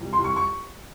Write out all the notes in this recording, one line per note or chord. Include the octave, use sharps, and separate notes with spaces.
C2
C6
C2
C#6
C#6